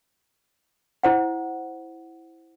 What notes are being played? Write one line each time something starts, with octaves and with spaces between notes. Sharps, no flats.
E4 C5 F#5